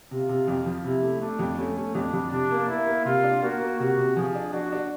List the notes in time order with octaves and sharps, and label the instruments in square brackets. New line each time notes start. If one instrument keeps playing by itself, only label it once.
[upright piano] C3 [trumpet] F4
[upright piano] C3
F2
F3
[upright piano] C3 [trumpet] E4
[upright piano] A3
[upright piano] A3 [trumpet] D4
[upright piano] F2
[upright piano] A3 [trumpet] C#4
[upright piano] A3
[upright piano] F2 [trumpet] D4
[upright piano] F2
[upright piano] C3 [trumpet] D4
[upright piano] A#3
[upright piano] A#3 [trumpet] E4
[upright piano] A#3
[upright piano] C3 [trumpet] F4
[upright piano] D4
[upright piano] A#3 [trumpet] F#4
[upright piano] A#3
[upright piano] C3 [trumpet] F#4
[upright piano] C3
[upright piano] F3 [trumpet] G#4
[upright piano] D4
[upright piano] D4 [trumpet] F#4
[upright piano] D4